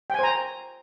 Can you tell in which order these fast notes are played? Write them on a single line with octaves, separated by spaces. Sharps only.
G5 G#5 C5 A#5